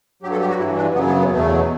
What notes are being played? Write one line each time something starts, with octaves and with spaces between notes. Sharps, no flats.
G2 F#3 G4
A4
G4
F#4
G2 E3 E4
D4
F#2 C#3 F#3 B3
B3
B3
E2 B2 F#3 A3